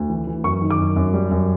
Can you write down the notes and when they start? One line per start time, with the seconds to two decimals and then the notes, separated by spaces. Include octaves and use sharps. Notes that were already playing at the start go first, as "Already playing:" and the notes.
Already playing: D2
0.10 E3
0.27 E3
0.44 F#2 C#6
0.62 D#3
0.70 D6
0.78 F#2
0.96 F#2
1.14 G3
1.31 F#2